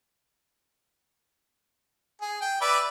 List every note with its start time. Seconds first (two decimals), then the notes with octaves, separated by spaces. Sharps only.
2.22 G#4
2.41 G5
2.61 B4 D5 E5